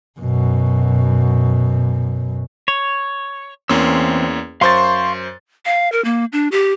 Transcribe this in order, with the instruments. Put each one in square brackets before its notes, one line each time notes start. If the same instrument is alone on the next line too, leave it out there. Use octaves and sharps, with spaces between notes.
[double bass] F#2 B2
[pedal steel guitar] C#5
[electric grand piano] E2 A#3 C#4 [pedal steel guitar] E3 C4 E6
[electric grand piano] F#2 C5 A6 [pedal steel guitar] F5 C6 C#6
[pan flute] F5
A#4
A#3
D4
G4